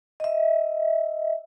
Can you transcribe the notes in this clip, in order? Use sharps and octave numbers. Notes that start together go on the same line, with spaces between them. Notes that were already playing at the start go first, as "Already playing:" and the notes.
D#5 E5